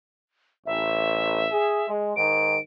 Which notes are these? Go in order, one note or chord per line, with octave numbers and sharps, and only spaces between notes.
A1 E5
G#4
G#3
G#2 D#3 D7